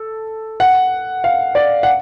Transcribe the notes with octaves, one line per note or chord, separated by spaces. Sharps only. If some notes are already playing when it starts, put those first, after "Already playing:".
Already playing: A4
F#5
F5
D5
F#5